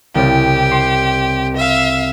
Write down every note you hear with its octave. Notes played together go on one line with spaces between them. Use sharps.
C2 C#3 G4
C6
E5 F5